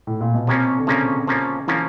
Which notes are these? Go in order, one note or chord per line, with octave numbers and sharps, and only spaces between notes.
A2
A#2
B2
C3 F3 A#3 C#4
D3
C#3 F3 A#3 C#4
F3 A#3 C#4
E3 F3 A#3 C#4